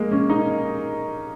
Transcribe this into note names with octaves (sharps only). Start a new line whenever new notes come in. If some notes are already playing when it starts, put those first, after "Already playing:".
Already playing: G#3 A#3
C#4
D#4